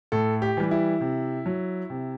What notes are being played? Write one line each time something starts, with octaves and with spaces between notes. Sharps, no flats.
A2 A4
G4
E3 G3
E4
C3
F#3
C3